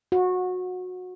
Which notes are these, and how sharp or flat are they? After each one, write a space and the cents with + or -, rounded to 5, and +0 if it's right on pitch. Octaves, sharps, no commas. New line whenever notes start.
F#4 -20